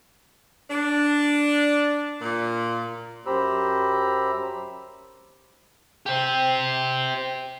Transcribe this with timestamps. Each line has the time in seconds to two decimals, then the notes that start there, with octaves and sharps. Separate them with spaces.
0.70 D4
2.22 A#2
3.26 F#2 G4 C5 A#5 B5 E6
6.06 G4 C5